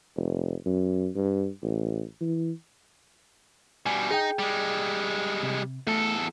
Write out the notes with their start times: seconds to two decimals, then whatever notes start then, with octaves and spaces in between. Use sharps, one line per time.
0.16 F1
0.65 F#2
1.15 G2
1.62 A1
2.21 E3
3.86 B2 G3 G#5
4.11 D#4 G#4 G5
4.39 G3 G#3
5.43 C3
5.87 E2 A3 A4